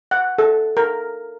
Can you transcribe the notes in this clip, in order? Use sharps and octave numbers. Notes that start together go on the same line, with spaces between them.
F#5
A4
A#4